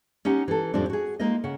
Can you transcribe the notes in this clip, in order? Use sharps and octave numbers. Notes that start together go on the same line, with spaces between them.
C#4 D#4 G4 F#5
E3 A4
F2 A2 F3 G3 C4 D4
F#4 G#4
G#3 A#3 D#4 F4 D#5
C#3 F#5